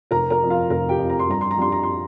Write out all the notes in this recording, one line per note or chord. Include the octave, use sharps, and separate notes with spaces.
F1 A#4 A#5
A#4 A#5
F2 F3
F4 F5
F1 A#4 A#5
G4 G5
F2 F3
A#5
C6
G2 A#5
C6
A#5
G3 D4 C6
A#5
C6